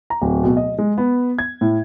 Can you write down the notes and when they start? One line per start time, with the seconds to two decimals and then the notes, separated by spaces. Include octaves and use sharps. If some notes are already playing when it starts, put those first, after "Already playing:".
0.10 A#5
0.22 D1
0.43 B2
0.57 D#5
0.79 G#3
0.98 B3
1.39 G#6
1.61 A2